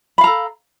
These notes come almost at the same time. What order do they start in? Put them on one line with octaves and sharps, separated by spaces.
B5 F5 A#5 A4